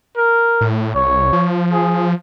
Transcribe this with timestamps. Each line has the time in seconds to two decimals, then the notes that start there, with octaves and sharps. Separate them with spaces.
0.17 A#4
0.61 A2
0.95 C2 C#5
1.33 F3
1.71 G#4